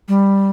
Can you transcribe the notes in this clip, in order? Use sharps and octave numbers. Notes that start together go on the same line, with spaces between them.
G3